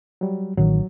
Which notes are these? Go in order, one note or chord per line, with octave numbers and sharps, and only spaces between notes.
F#3 G3
A1 D#3 F#3